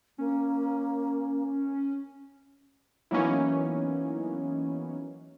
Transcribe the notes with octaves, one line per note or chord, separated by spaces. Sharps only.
A#3 C#4
E3 F#3 A#3 B3 C#4 D#4